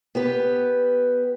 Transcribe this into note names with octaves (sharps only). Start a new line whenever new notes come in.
B3 G4 B4